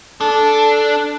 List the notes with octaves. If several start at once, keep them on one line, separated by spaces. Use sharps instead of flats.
D4 A4